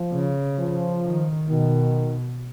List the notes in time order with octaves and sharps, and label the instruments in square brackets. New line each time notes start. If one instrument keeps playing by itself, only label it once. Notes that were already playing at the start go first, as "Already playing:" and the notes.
Already playing: [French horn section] F3
[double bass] C#3
[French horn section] F3
[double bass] D#3
[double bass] B2 [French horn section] D#3